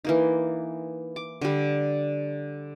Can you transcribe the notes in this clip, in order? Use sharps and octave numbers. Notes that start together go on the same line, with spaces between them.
E3 A#3 D#4
D6
D3 G3